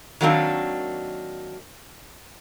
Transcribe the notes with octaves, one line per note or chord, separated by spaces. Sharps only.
D#3 F#3 A#3 C4 D4